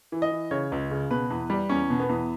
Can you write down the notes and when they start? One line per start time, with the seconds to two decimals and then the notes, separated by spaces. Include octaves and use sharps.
0.12 E3
0.22 D#5
0.32 E3
0.51 C#3 C#5
0.72 C#2
0.91 C#3
1.11 B2 B4
1.30 E2
1.50 G3
1.69 E2 C#4
1.90 B2
2.00 B3
2.09 E2